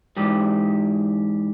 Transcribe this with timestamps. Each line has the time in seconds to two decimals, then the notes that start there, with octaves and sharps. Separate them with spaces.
0.17 G#2 E3 G4